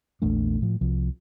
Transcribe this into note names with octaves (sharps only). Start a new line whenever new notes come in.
A#1 E2 A3 D4
A2 F3
C2 F3